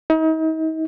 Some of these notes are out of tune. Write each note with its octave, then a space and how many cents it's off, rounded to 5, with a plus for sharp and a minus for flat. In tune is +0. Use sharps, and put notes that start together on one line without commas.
D#4 +40